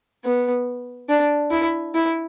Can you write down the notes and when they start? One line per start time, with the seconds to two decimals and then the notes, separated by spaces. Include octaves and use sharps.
0.24 B3
1.09 D4
1.51 E4
1.94 E4